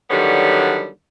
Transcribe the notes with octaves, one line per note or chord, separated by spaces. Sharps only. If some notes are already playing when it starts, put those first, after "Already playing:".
D3 D#3 F#3 G3 B3 C#4